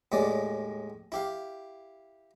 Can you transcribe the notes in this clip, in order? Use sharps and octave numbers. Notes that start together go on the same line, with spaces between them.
D#2 A2 G#3 D5
E4 G4 F5